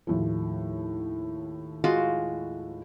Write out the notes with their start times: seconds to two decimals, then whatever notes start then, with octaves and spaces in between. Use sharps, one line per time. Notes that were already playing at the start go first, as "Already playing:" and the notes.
0.07 D#2 A2 F3
1.84 G#3 F4 F#4